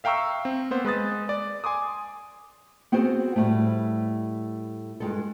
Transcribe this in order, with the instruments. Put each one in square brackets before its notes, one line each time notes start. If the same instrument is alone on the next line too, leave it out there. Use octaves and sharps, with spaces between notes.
[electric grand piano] E5 F5 G5 A#5 C#6 E6
C4
A#3 B3 C5
G#3 B4 D#6 A6
D5
G#5 C6 D6 D#6
[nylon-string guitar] B3 C4 F#4 G#4 C5
A2 G3 A3
G2 G#3 A4